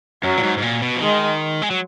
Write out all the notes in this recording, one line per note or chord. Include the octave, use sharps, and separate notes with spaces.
F#2 F#3
A#2
G#2
G#2
A#2
B2
F3
D#3 G#3
G#3
F#3